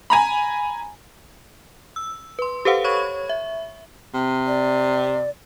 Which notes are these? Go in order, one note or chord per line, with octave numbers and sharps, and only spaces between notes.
G#5 A#5 B5
E6
B4 C6
G4 A4 B4 C5 F5 F#5
C#5 B5 C#6 G#6
E5
C3
D5